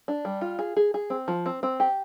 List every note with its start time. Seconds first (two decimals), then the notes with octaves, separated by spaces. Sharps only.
0.08 D4
0.25 G3
0.41 F4
0.59 G#4
0.77 G#4
0.94 G#4
1.10 C4
1.28 F3
1.46 C4
1.63 C4
1.80 G4